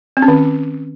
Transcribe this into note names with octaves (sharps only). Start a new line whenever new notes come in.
C4
C#4
D#3